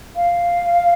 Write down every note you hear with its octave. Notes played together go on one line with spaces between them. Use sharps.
F5